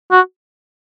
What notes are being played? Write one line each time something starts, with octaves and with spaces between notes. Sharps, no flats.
F#4